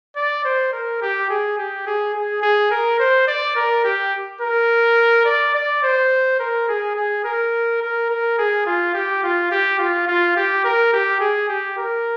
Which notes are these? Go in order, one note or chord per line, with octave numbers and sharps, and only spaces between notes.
D5
C5
A#4
G4
G#4
G4
G#4
G#4
G#4
A#4
C5
D5
A#4
G4
A#4
D5
D5
C5
A#4
G#4
G#4
A#4
A#4
A#4
G#4
F4
G4
F4
G4
F4
F4
G4
A#4
G4
G#4
G4
A#4